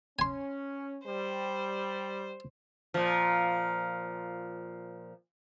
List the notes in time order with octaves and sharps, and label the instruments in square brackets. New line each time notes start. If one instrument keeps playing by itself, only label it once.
[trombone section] C#4 [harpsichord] G#5 C6
[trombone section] G3 [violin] C5
[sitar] A#2 F3